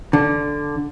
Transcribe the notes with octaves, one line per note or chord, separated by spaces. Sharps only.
D3